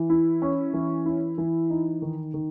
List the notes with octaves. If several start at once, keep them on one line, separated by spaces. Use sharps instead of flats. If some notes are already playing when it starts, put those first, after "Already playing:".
Already playing: E3
E4
C#4
E3
E4
E3
D#4
D#3
D#3